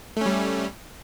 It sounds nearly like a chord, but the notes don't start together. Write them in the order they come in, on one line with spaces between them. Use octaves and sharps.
A3 C#4 G3